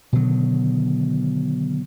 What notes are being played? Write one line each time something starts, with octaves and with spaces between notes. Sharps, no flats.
B2 D3 D#3 F#3